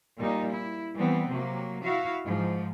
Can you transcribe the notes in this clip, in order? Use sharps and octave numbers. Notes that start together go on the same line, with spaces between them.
A#2 G3 D#4
E4
E3 G3 B3 C4
C3 F#3 A#3
E4 F#4 F5
G#2 F3